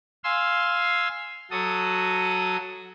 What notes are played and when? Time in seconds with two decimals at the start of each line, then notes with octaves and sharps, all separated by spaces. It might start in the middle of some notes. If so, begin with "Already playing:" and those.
0.24 F5 G#5 C6 E6
1.51 F#3 F#4 A4 D#6